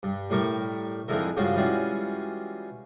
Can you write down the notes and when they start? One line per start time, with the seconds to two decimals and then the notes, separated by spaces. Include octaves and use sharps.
0.03 G2
0.30 A2 G3 A#4 C#6
1.08 F2 D3 G#3 D#4 E4 A#4
1.37 G2 C#3 F3 G#3 F4 F#4
1.56 E3 G3 G#3 C#4 F4 F#4